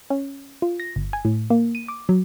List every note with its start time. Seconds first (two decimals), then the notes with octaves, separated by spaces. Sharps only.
0.10 C#4
0.62 F4
0.80 A#6
0.96 G1
1.13 G#5
1.25 A2
1.50 A#3
1.75 D#7
1.88 D6
2.09 F#3